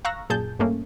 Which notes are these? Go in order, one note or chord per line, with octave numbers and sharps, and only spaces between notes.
F5 A#5 C#6 E6 F#6 A#6
F#2 A#2 G#4 A5 G6
G2 A3 A#3 C#4